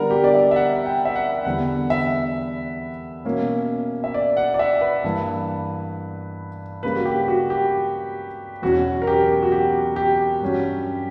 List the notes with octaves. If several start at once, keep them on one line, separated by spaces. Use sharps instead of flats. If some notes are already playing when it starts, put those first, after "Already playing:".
Already playing: D3 G3 B3 D4 A#4 F#5
G4
D5
E5
E5
F#5
G5
E5
F#5
E2 D3 G3 B3 F#5
E5
B2 A#3 C#4
E5
D5
F#5
D5
E5
B4
G2 E3 A#3
C#3 G3 A#3 D4 B4
F#4
G4
F#4
G4
E2 B2 F#3 C#4 F#4
A#4
G4
F#4
G4
G4
G2 F#3 C#4